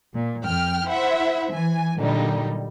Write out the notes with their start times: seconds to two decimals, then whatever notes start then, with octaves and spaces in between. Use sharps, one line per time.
0.14 A#2
0.44 F2 G5 F6
0.86 E4 C5 E5 F#5
1.52 E3 G#5
1.98 A#2 D3 F#3 G3 D#4